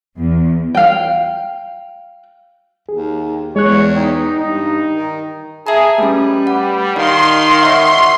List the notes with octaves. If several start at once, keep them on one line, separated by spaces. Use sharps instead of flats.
E2
F5 G5
D#2 G#4
E2 G#3 C#5 F#6
D#4 G5
G2 D#4
D#3
G#4 E5 A5 A#5
G3 A3 C#4 B4
F#5
D#3 D#4 F5 C6
C#5 E5 F#5